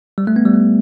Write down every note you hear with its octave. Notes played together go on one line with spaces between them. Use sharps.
G3
A3
B3
G3
A3